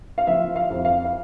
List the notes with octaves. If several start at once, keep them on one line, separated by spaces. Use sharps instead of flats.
F5
F3 E5
F5
F2
F5
F5